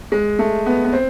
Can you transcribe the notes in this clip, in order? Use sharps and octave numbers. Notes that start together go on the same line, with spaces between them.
G#3
A3
B3
B3
C4